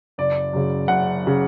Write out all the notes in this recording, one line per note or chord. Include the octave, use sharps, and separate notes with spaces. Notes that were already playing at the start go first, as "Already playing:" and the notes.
F#1 D5
F#2 C#3
F#1 F#5
C#3